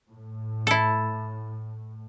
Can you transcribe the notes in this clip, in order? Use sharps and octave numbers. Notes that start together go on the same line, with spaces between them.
A2
E4 A4